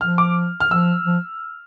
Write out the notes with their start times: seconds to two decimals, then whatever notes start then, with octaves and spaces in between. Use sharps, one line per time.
0.01 F3 F6
0.18 D6
0.60 F6
0.71 F3 E6
1.06 F3